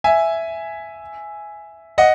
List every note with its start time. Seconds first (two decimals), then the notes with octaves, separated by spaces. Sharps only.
0.04 E5 G#5
1.98 D#5 F#5